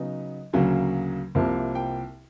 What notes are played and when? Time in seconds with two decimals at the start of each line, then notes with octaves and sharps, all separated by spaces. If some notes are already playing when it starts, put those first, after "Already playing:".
Already playing: C#3 F#3 B3 D#4
0.53 D2 C#3 F#3 A#3
1.35 C2 C3 F3 A#3
1.75 G5